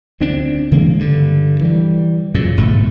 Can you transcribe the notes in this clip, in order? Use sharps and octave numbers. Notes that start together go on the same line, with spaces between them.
D2 C4 D4
C#3 E3 G#3 A#3
G2 D3
E3 G3
F#2 A#2 C#3
G1 G#2 B2 A3